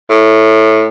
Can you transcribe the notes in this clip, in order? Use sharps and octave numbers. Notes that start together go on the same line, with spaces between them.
A2